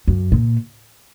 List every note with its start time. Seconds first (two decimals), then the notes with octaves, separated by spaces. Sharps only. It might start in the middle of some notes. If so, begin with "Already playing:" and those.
0.08 F#2
0.32 A#2